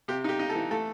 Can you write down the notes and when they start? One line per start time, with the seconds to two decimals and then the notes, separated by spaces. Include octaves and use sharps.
0.08 C3 G4
0.24 D#4 G4
0.39 D#4
0.50 A4
0.55 E3
0.71 A3 A4